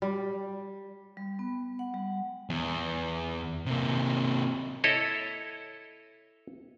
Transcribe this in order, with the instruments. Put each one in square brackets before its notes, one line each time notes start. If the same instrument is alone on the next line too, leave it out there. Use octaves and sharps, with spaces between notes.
[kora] G3
[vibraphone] G3
B3
F#5
G3
[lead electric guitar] E2
C3 A#3
[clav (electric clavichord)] E4 A4 C#5 D#5